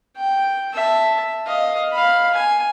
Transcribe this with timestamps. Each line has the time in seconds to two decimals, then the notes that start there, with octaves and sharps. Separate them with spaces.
0.16 G5
0.73 E5 A5
1.46 D#5 F5
1.91 F5 B5
2.33 G#5